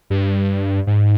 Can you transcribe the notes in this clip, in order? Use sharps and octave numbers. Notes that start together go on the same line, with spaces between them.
G2
G#2